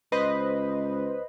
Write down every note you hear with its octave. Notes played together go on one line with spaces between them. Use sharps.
C#2 B4 C5 D#5